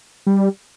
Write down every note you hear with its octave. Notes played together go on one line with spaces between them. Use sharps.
G3